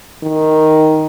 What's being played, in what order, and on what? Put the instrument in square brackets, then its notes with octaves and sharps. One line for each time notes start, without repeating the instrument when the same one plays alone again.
[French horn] D#3